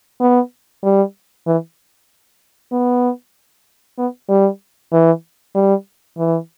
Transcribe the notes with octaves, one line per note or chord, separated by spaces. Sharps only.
B3
G3
E3
B3
B3
G3
E3
G3
E3